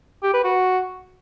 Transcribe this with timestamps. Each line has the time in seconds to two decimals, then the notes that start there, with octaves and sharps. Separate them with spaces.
0.23 G4
0.34 B4
0.44 F#4